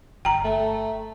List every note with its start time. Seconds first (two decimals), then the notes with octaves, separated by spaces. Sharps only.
0.25 G1 G5 A#5
0.45 A3